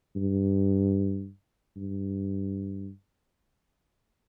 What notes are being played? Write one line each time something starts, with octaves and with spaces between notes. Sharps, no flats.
G2
G2